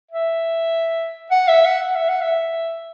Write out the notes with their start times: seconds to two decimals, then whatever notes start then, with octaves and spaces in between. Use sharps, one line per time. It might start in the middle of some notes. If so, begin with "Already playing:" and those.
0.11 E5
1.31 F#5
1.48 E5
1.65 F#5
1.83 F#5
1.96 E5
2.09 F#5
2.22 E5